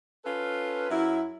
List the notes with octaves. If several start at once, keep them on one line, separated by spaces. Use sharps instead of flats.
C#4 F4 A4 B4
F#2 F#3 E4